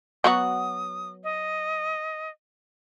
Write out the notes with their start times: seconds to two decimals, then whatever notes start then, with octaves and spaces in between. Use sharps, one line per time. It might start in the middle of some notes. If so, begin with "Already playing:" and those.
0.24 F#3 B3 F#4 D#6
1.24 D#5